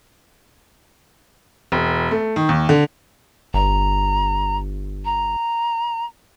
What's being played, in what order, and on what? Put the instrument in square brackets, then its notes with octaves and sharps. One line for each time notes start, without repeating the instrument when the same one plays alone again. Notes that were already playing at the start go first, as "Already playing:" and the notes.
[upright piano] E1
A3
D#3
D#2
D3
[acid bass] G1 [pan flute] A#5
[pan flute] A#5